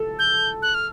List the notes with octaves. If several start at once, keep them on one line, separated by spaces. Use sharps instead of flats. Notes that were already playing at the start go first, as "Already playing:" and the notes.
Already playing: A4
G6
F#6
F6